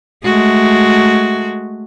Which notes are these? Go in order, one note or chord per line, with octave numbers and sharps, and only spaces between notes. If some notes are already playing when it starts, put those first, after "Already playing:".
G#3 A3 F#4